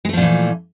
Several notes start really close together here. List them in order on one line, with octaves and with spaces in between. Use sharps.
G#3 A3 F3 A#2 E3